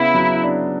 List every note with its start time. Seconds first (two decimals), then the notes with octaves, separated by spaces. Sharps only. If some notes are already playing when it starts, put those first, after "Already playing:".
Already playing: C#3 B3 E4
0.15 F#3
0.43 D4